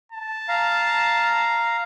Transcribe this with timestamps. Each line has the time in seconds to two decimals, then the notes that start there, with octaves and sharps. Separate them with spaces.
0.12 A5
0.48 F5 A#5